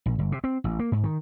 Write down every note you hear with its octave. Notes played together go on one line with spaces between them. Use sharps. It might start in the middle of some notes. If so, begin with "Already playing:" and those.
A#1
G1
C3
C4
A1
A#3
G#2
D#3